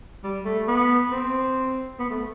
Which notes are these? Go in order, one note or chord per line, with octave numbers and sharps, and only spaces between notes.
G3
A3
B3
C4
B3
A3